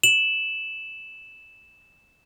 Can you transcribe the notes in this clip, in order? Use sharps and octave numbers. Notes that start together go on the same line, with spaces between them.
E7 F#7